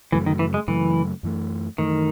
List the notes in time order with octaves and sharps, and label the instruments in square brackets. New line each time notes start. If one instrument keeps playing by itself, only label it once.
[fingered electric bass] F#2 C#3 F#3 A3 [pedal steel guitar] E3
[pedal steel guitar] D#3
E3
G#3
[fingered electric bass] F#2 C#3 F#3 A3 [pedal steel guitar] E3
[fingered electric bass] F#2 E3 A3
[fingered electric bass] F#2 E3 A3 [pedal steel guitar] D#3